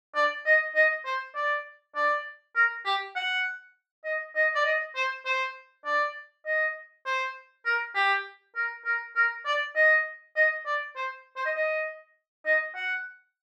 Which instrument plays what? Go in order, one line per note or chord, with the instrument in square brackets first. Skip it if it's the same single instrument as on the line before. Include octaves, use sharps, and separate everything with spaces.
[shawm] D5
D#5
D#5
C5
D5
D5
A#4
G4
F#5
D#5
D#5
D5
D#5
C5
C5
D5
D#5
C5
A#4
G4
A#4
A#4
A#4
D5
D#5
D#5
D5
C5
C5
D#5
D#5
D#5
F#5